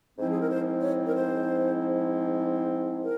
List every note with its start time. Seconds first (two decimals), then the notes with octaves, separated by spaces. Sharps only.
0.18 G#2 F3 C4 E4 C5
0.30 G#4
0.39 A#4
0.49 C5
0.81 C#5
1.05 A#4
1.13 C5
3.03 A#4